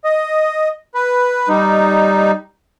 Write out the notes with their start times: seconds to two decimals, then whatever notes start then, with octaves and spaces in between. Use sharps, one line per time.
0.04 D#5
0.95 B4
1.49 G3 D#4